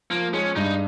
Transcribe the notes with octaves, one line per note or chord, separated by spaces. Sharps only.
F3 A#3
G#3 C#4
G2 D#4